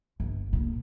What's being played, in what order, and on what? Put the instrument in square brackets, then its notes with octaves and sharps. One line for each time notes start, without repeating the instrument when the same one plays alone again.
[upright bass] G1
A#2